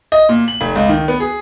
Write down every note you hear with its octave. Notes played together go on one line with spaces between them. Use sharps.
D#5
A#2
F#7
F1
C#2
D#3
B3
G#4